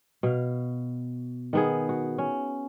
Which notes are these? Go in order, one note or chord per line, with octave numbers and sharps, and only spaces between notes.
B2 F5
D#3 B3 G#4
F#4
C#4